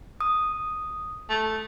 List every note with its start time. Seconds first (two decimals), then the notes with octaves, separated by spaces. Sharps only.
0.21 D#6
1.30 A3